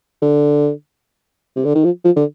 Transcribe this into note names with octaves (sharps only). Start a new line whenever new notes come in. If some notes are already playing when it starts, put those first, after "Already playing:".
D3
C3
D3
D#3
F3
F3
D3